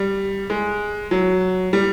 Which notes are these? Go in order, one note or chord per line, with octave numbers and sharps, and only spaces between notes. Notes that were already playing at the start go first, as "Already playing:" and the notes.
Already playing: G3
G#3
F#3
G3